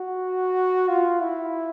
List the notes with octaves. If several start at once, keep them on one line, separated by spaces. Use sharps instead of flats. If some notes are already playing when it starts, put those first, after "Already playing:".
Already playing: F#4
F4
E4